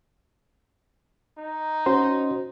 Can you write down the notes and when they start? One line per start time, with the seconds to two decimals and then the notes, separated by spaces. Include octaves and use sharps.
1.39 D#4
1.86 C#4 F#4 C5